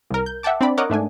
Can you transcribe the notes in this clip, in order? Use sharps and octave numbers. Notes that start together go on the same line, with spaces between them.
C2 A#4
G6
E5 F#5 G5 A5 D6
C4 D4 D5 B5
A#4 C#5 D#5 F#5 D6
G#2 A3 D4 G#5